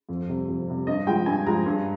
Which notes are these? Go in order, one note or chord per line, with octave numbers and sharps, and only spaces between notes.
F2
C3 G3
F2
C3 G3
G2 D#5
F3 G#3 G5
G2 G#5
F3 G#3 A#5
G2